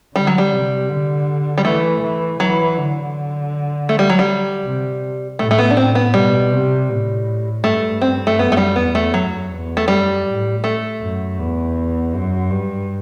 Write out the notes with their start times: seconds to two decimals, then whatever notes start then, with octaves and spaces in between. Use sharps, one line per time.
0.15 D3 G3
0.27 F#3
0.38 G3
0.53 C3
0.90 D3
1.58 G3
1.65 E3 A3
2.02 E3
2.40 E3 F#3
2.77 D3
3.89 A3
3.99 G3
4.10 F#3
4.19 G3
4.64 C3
5.39 A2 A3
5.51 A3
5.58 B3
5.71 D4
5.77 C4
5.95 B3
6.14 B2 G3
6.52 C3
6.90 A2
7.64 G2 A3
8.02 C4
8.27 A3
8.38 F#2 B3
8.52 A3
8.57 G3
8.76 E2 B3
8.95 A3
9.13 F#2 F#3
9.51 E2
9.77 A3
9.88 F#2 G3
10.26 A2
10.64 A3
11.01 F#2
11.38 E2
12.13 F#2
12.51 G2